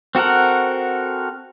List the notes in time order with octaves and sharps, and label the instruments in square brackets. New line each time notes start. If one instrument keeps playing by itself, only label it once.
[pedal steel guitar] C4 F#4 A4 A#4 F#5